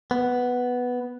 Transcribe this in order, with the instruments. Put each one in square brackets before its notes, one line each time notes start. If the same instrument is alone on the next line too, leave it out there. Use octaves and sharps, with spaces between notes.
[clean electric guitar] B3